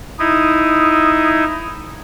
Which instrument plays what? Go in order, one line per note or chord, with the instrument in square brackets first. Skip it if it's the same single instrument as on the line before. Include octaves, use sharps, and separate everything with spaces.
[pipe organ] D#4 E4 [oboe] D#6